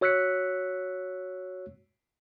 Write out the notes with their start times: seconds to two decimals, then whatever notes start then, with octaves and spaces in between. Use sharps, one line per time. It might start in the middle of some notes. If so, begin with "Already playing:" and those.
0.01 F#4 C#5 E6 F#6 B6 C#7